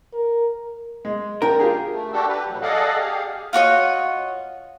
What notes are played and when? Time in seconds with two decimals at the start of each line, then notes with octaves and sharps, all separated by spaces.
0.14 A#4
1.05 G#3
1.42 D4 A#4 G5
1.59 F4 G4 G#4
1.92 A3
2.12 D4 F#4 G4 A4
2.28 G4 B4
2.47 A2 E3 F#3
2.62 G#4 A4 D5 D#5 F5 F#5
2.98 G4 G#4 F5
3.53 F4 F#4 C#5 D#5